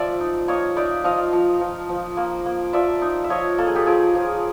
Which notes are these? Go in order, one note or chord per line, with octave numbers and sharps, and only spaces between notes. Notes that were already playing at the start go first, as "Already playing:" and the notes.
Already playing: F3 D5 E5
D#4
A#3 C#5 D#5
D#4 D5 E5
F3 D#5 F5
F3
F3
F3
A#3
A#3
F3 D5 E5
D#4
E5
F3 C#5 D#5
A#3 A4
G#4
G4 A4
F3 G#4 A#4
F3